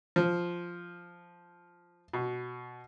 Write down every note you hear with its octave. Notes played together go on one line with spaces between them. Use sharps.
F3
B2